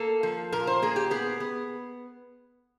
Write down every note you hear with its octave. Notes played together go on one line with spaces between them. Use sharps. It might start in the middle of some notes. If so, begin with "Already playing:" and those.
Already playing: A#3 A4
F3
A#2 A#4
C5
A#3 G#4
G4
B3 G#4
B3